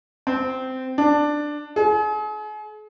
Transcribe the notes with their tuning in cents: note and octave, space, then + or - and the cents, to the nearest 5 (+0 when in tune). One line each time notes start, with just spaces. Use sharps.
C4 -15
D4 +10
G#4 +40